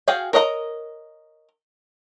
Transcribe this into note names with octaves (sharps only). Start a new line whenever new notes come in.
F#4 G#4 F5 G5 G#5
A#4 C#5 D#5 F5 A#5